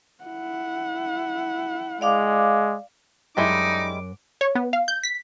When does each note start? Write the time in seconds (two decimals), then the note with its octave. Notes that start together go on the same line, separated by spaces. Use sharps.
0.24 E4 F#5
2.01 G#3 D5 F5 D6
3.37 F#2 G3 G#3 D#4 E4 D6
4.41 C#5
4.55 B3
4.73 F5
4.88 G6
5.03 B6